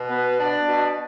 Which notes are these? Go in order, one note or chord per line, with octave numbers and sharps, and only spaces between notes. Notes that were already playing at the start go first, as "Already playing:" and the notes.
Already playing: B2
B3
D4
B2